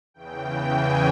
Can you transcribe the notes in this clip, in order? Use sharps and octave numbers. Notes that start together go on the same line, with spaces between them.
E2 C#3 E3 G5
G#5